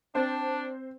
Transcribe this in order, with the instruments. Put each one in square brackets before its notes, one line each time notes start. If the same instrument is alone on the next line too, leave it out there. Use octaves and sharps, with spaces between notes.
[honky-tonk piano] C4 C5 [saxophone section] D4